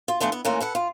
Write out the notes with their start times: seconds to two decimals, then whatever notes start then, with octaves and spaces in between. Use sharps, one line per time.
0.08 F4
0.20 E3 F#3 A3 B3 D4 F4
0.32 B3
0.45 E3 A3 A#3 C#4 D4 F4
0.60 A4 B4 F#5
0.75 F4